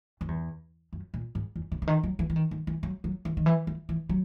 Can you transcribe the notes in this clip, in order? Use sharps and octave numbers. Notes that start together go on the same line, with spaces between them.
F#2
E2
F#2
A#2
G#2
E2
C#3
C#3
D#3
F#3
E3
E3
D#3
D#3
E3
F#3
F#3
E3
D#3
E3
E3
E3
F#3